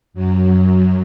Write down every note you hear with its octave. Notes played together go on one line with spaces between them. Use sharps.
F#2 F#3